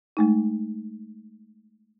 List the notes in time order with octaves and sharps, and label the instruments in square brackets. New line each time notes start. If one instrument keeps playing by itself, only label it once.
[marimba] G#3 A3 D#4